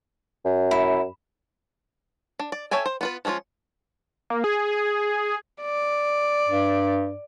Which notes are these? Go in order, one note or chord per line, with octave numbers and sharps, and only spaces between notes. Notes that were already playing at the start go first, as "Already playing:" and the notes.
F#2
E4
D4
D5
A4 C#5 E5 G5 G#5
C5
B3 F4 B4
F3 G#3 C#4 D#4 F4
A#3
G#4
D5
G2